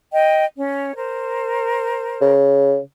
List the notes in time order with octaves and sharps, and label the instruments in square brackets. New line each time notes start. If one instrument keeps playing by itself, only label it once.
[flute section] D#5 G5
C#4 C#5
A#4 C5
[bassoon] C#3